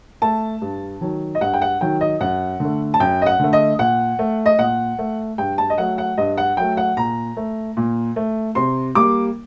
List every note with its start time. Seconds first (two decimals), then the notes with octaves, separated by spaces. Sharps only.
0.22 A3 A5
0.62 G2
1.01 D#3 F#3
1.35 D#5
1.41 G2 F#5
1.54 G5
1.62 F#5
1.81 D#3 F#3 G5
2.01 D#5
2.20 F#2 F#5
2.60 D3 A3
2.94 A5
3.00 F#2 G5
3.22 D#5
3.26 F#5
3.40 D3 A3
3.53 D#5
3.79 A#2 F#5
4.19 A3
4.46 D#5
4.59 A#2 F#5
4.99 A3
5.38 G2 G5
5.58 A5
5.70 D#5
5.78 F#3 A3 F#5
5.98 F#5
6.17 G2 D#5
6.38 F#5
6.57 F#3 A3 G5
6.77 F#5
6.97 A#2 A#5
7.37 A3
7.77 A#2
8.16 A3
8.55 C3 C6
8.95 G3 A#3 D6